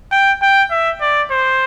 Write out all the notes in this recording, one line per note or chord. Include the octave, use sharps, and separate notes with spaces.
G5
G5
E5
D5
C5